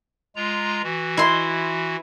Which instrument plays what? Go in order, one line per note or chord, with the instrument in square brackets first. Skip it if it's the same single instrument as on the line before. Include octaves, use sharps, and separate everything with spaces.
[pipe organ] G#3 F4 A#5
E3 F#4
[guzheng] E4 C6